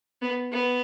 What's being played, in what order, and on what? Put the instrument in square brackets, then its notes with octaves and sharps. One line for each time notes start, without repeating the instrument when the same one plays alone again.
[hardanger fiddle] B3
B3